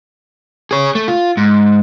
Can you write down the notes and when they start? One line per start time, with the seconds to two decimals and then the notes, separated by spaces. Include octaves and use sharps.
0.71 G#4 C#5
0.95 A3
1.08 F4
1.37 G#2